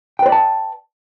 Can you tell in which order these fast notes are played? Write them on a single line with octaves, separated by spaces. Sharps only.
G5 B4 C5 D5 A5